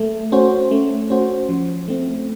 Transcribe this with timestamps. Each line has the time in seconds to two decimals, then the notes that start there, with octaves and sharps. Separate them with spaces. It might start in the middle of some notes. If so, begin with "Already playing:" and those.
Already playing: A3
0.32 C#4 F#4 C5
0.71 A3
1.10 C#4 F#4 C5
1.49 F3
1.88 A3 C4